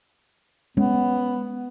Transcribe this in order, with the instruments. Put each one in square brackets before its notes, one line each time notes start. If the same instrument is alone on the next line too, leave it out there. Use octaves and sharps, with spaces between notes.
[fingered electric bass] G#3 C#4 [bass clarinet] B3